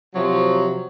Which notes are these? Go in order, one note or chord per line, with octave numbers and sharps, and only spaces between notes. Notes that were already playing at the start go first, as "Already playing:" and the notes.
C3 F3 F#3